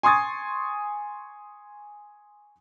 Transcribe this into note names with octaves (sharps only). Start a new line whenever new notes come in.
G#5 C6 C#6 D#6 G#6 A6